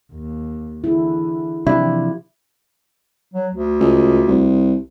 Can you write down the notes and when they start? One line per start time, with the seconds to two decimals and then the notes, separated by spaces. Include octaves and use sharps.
0.12 D#2
0.84 D3 E3 E4 G#4
1.67 C3 E3 F3 D4 E4 G4
3.34 F#3
3.54 D2
3.80 C#2
4.27 C2